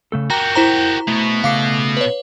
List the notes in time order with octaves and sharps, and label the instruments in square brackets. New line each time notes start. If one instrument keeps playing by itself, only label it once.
[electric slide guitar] C#3 A3 A4
[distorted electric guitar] F#4 G4 [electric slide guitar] A#4 G5 [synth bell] A#5
[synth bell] E4 C5 A#5
[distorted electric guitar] B2 B3 [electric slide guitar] A3
[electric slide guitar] C#3 A3 A4 [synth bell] F5 D6 C7
[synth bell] B4 C#5